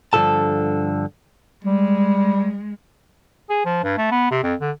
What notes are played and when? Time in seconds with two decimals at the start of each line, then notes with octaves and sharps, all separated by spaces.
0.13 G2 D3 E3 F3 A4 A5
1.64 G3 G#3
3.50 G#4
3.65 F3
3.84 G2
3.98 A3
4.11 B3
4.31 C3
4.43 F2
4.61 D3